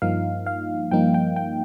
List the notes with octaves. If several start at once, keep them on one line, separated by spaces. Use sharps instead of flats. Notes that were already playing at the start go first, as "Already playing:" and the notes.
G2 F3 A#3 D#4 F5
F5
G2 F3 A#3 D#4 G5
G5
G5